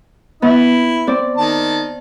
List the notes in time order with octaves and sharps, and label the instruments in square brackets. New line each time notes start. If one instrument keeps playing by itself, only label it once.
[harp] B3 [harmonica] E4
[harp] C4 D5
[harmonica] D#3 A5